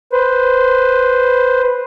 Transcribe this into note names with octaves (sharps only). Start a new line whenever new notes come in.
B4 C5